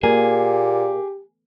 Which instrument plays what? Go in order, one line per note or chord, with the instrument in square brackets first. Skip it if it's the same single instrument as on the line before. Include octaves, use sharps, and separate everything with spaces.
[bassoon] A#2 [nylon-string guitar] A#3 [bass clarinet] G4 [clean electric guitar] G#4